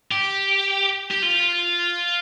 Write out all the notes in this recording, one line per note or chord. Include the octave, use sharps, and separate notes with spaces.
G4
G4
F4